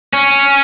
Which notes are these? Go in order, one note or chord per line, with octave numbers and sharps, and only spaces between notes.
C#4